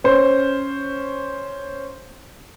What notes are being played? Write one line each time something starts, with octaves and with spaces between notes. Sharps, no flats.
C#4 C5